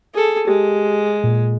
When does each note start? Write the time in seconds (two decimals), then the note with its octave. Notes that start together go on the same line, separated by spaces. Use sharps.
0.13 G#4 A4
0.47 G#3 G4
1.24 A#2